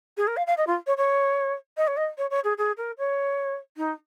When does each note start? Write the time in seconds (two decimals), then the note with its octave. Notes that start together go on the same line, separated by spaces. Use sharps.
0.17 G#4
0.27 A#4
0.36 F5
0.47 F5
0.57 D#5
0.67 F4
0.86 C#5
0.97 C#5
1.77 D#5
1.87 C#5
1.97 D#5
2.18 C#5
2.30 C#5
2.44 G#4
2.58 G#4
2.77 A#4
2.98 C#5
3.77 D#4